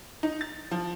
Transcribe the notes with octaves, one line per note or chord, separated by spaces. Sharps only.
D#4
A6
F3